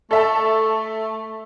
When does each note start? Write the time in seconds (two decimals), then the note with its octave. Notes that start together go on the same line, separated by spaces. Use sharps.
0.11 A3 A4 E5 A5